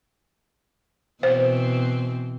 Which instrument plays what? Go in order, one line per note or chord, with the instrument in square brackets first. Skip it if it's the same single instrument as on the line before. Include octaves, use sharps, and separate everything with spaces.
[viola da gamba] B2 E3 C4 [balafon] C5